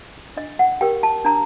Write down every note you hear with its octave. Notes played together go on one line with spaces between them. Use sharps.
D4 D#5
F#5
G4 A#4 G5
A5
D4 A#5